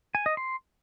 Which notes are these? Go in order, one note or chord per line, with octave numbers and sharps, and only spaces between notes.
G#5
D#5
C6